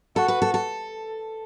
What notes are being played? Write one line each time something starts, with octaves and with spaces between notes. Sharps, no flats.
F#4 A4
B4
A4
A4